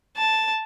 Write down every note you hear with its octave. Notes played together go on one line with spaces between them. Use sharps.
A5